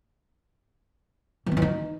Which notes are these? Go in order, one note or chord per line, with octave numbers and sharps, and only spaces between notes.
E3
C4
E3
D#4